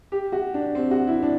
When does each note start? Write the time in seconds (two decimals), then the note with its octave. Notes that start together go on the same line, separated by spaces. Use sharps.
0.12 G4
0.32 F#4
0.54 D4
0.75 C4
0.91 F#4
1.07 E4
1.22 D4